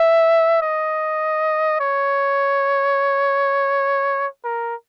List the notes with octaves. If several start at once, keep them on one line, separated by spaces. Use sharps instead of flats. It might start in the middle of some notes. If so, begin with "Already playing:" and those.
Already playing: E5
D#5
C#5
A#4